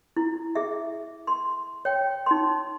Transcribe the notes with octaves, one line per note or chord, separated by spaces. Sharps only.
E4
G#4 E5
C6
C#5 G5
D#4 C6